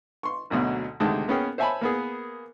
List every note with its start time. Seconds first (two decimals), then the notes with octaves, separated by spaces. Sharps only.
0.23 C6 C#6
0.50 G#1 D2 B2 F#3
1.00 D2 C3 D#3 G#3 A5
1.28 A#3 B3 C#4 G#4 G5
1.58 C5 C#5 E5 G#5 A5 B5
1.81 A#3 B3 G#4